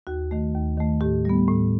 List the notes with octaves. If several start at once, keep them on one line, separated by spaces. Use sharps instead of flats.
D#2 F#4
D#3 A3
D#2
D#3 A3
A2 G4
G3 B3
A2